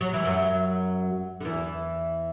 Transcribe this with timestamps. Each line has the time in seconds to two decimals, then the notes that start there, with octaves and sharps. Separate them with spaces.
0.01 F#3
0.14 E3
0.24 F#2 F#3
1.41 D3
1.45 E2 E3